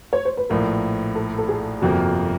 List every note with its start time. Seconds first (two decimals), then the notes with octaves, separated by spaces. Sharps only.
0.13 C#5
0.25 C5
0.37 B4
0.50 A#1 A2 F3 A#4
1.15 A4
1.38 A4
1.49 G#4
1.81 G1 F2 C3 F3 A#3 F#4